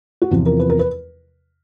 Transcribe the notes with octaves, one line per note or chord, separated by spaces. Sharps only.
F#4
E2 C3 F3 F4
A#4
B4
A#4
B4